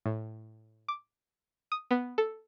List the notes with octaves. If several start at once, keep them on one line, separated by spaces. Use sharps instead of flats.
A2
D6
D#6
B3
A4